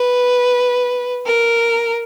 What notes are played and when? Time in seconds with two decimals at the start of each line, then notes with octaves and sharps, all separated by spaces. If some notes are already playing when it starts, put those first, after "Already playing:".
Already playing: B4
1.26 A#4